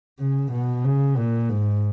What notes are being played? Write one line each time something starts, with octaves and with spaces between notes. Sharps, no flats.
C#3
B2
C#3
A#2
G#2